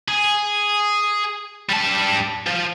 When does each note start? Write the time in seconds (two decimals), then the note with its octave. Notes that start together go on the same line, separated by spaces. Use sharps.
0.08 G#4
1.69 G3 A5
2.46 F3